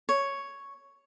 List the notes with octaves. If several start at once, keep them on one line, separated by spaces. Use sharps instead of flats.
C#5